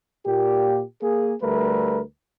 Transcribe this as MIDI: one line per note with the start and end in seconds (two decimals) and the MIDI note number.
0.27 0.83 46
0.27 0.83 67
1.02 1.34 58
1.02 1.34 68
1.42 2.01 38
1.42 2.01 55
1.42 2.01 57
1.42 2.01 70
1.42 2.01 71